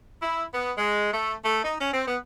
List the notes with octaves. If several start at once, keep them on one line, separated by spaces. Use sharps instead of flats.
E4
B3
G#3
A3
A3
D#4
C#4
C4
B3